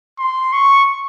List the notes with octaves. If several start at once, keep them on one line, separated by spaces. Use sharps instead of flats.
C6
C#6